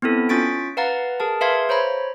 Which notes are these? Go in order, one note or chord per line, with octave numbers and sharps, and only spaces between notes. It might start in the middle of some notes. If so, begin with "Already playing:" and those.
B3 C4 E4 A4
C#4 F4 C#6 A6 B6 D7
B4 F5 F#5 A#5 A6
G#4 A#4 A5
G#4 B4 E5 F5 C6 G#6
C5 C#5 A#5 B5